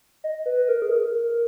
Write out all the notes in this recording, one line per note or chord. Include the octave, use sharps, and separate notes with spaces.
D#5
B4
A#4
G#4
A#4
A#4